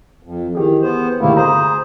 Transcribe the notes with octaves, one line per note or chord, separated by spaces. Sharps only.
F2
D#3 E3 G4 G#4
B3 C5
D2 C3 D#3 A#3 E4
G#4 C5 A#5